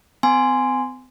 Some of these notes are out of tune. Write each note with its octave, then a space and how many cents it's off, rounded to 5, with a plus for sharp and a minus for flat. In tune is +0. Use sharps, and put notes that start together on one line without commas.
C4 -45 G#5 +0 C6 -10